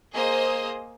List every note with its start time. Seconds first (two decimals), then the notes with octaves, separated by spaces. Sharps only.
0.14 A#3 G#4 C5 D#5 D#6